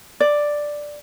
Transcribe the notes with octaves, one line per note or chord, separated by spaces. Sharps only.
D5